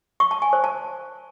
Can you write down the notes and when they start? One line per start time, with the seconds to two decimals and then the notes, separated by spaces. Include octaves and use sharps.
0.20 C#6
0.31 A5
0.42 G#5
0.53 C5
0.64 A5